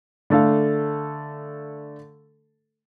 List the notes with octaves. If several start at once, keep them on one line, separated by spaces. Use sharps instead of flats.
D3 A3 A4 F5